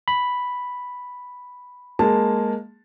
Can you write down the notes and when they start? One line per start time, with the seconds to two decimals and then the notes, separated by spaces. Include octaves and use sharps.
0.08 B5
1.99 G#3 A#3 A5